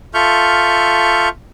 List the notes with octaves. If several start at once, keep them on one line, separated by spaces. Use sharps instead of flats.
F4 A4 E5 C#6 F6 G6